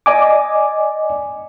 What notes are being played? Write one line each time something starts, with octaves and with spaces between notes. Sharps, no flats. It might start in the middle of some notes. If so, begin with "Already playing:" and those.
D5 D#5 G#5 D6